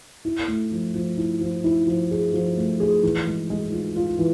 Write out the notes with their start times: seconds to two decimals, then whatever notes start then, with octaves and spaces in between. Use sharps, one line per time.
0.25 E4
0.48 A3
0.71 F3
0.95 F3
1.17 E4
1.41 F3
1.64 E4
1.87 F3
2.11 G#4
2.34 F3
2.57 A3
2.80 G#4
3.03 E3
3.27 G#3
3.50 G#3
3.72 F4
3.96 F4
4.19 E3